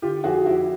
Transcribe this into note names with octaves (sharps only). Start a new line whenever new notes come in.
D3 F4 G4
F2 F#4 G#4
F2 E4 F#4